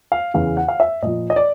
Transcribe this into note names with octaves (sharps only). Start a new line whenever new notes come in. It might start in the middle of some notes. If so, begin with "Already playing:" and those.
F5
E2 C#3 E3 F5
F#5
F5
E5
A#2 F3 D#5
D#5
D5